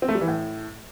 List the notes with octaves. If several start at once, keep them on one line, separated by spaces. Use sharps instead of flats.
C4
A3
G3
E3
A2